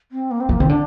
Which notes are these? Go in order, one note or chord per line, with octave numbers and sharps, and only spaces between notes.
C4
A#3
C4
F3 A#3
D#3 C4
D3 D4